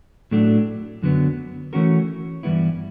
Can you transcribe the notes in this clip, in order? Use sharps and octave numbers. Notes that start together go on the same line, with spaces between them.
A2 F#3 A3 D4
F#2 D3 F#3 B3
E3 A3 C#4 F#4 A#4
G2 E3 G3 B3 E4